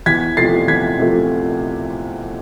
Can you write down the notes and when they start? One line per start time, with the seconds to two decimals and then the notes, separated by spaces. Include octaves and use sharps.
0.06 E2 G#6 B6
0.37 C3 F3 A3 A6 C7
0.67 E2 G#6 B6
0.98 C3 F3 A3